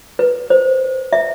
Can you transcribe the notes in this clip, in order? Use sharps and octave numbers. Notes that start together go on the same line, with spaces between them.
B4
C5
E5